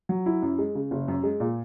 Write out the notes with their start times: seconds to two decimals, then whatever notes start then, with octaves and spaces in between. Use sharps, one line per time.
0.09 F#3
0.26 E4
0.42 F#2
0.58 G#3
0.75 C#3
0.91 F#1
1.08 F#2
1.23 G#3
1.40 A#2